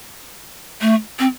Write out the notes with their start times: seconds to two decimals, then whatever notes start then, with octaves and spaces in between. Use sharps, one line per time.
0.81 A3
1.19 C4